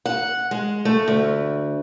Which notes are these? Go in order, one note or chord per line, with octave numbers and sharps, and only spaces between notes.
F#5
G#3
A3
D2